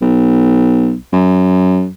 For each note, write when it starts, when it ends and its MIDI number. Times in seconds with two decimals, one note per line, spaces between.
0.01 0.94 35
1.13 1.87 42